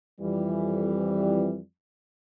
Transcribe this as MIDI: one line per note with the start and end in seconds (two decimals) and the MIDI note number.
0.21 1.60 41
0.21 1.60 52
0.21 1.60 55